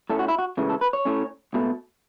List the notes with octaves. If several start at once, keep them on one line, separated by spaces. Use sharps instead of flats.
A2 A3 C#4 A4
F#4
E4
F#4
C#2 C#3 E3 A3
A4
B4
C#5
A2 A3 C#4
C#2 B2 A3